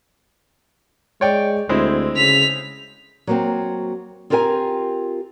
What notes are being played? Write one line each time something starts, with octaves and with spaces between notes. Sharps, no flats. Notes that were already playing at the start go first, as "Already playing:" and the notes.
G#3 C#5 D5 G5
D2 G#3 C4 E4
C#3 B6 F7
F#3 A#3 C4
C4 F4 G4 A#4 E5 G#5